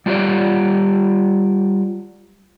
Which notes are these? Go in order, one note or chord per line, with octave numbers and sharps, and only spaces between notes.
G3 F4 G4 C#5 D5